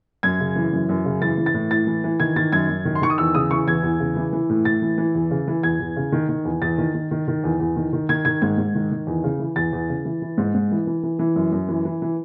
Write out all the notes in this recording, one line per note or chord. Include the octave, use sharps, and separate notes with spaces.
F#2 G#6
C#3
E3
F#2
F#2
C#3
E3 A6
E3
A6
A2
A2 A6
E3
E3
D#3 G#6
D#3 A6
F#2 G#6
F#2
D#3
C6
D#3 C#6
D#6
E2 E6
C#3 D#6
E3 C#6
E2 G#6
E2
C#3
E3
E3
A2
A2 A6
E3
E3
E2
C#3
E3
E2 G#6
E2
C#3
D#3
D#3
E2
E2 A6
D#3
D#3
D#3
D#3
E2
E2
D#3
D#3
D#3 G#6
D#3 G#6
G#2 G#6
G#2
D#3
D#3
E2
C#3
E3
E2 A6
E2
C#3
E3
E3
G#2
G#2
E3
E3
E3
E3
F#2
F#2
E3
E3
E3